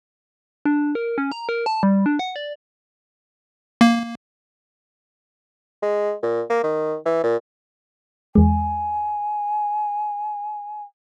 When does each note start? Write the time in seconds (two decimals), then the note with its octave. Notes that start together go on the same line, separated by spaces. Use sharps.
0.65 D4
0.95 A#4
1.18 C#4
1.32 A#5
1.49 A#4
1.66 A5
1.83 G3
2.06 D4
2.19 F#5
2.36 D5
3.81 A#3
5.83 G#3
6.23 A#2
6.50 A#3
6.64 D#3
7.06 E3
7.24 A#2
8.35 E2 G#3 G#5